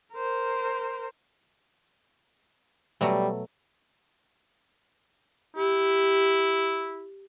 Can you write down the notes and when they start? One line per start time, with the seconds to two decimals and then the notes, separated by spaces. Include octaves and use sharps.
0.14 A#4 C5
3.01 B2 F#3 G3 A3
5.56 E4 G4